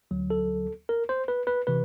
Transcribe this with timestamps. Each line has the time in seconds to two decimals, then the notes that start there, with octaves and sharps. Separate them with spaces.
0.11 D2 D3 F#3
0.30 A4
0.89 A#4
1.09 C5
1.28 B4
1.47 B4
1.67 C3 E3 B4